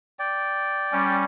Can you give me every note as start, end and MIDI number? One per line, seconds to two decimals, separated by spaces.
0.19 1.16 74
0.19 1.16 79
0.92 1.24 55
0.92 1.24 61